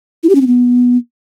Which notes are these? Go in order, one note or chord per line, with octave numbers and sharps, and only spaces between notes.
E4
G4
C#4
C4
B3